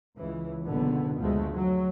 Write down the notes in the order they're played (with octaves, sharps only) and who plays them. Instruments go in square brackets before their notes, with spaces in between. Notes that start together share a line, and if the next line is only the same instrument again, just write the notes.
[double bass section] C#2 E3
F#1 C#2 B2 D3 B3
D2 F3 G#3 A3
F#3